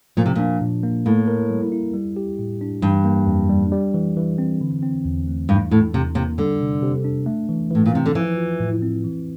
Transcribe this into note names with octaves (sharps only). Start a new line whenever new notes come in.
A#2 F3
C3
A#2 D4
A#2
A#3
A2 A#3
A#4
G3
E4
G3
G4
A2
D4
G2 E3
A#3
F2
G3
G3
E3
E3
C4
D3
C4
E2
A3
G2 E3
A2 E4
E2 C3
C3 A#3
D3 G3
C3
C3
D4
A3
E3
A2 E3
A#2
C3 C4
D3
E3 F3
F4
A2
C4
E3